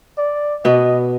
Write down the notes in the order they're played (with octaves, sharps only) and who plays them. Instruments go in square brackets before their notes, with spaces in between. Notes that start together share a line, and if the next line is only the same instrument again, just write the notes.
[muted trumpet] D5
[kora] B2 B3 [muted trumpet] D#5